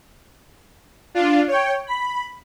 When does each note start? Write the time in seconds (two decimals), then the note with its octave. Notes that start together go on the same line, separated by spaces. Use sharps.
1.14 D4 F4
1.48 C#5 G5
1.87 B5